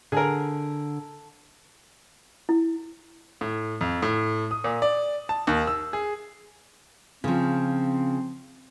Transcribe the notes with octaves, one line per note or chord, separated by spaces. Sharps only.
D3 G#4 A#4
E4
A2
F2
A2
D#6
A#2
D5
A5
D#2
E6
G#4
C#3 F3 C4